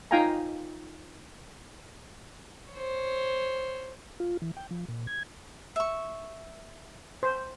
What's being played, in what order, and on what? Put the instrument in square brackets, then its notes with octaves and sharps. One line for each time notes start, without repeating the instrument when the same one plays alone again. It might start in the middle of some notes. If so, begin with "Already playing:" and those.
[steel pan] D#4 F4 F5 G5 G#5 A#5
[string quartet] C5 C#5
[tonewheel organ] F4
E3
G5
F3
A#2
G#6
[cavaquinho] E5 C#6
[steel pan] C5